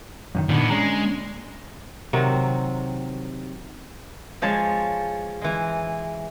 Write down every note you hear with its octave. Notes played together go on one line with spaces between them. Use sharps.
F#2 D3 D#3
A#2 D3 D#3 B3
G#3 C#4 D4 A#5
C3 D#3 F#3 C4
F3 G#3 C#5 A5
E3 G#3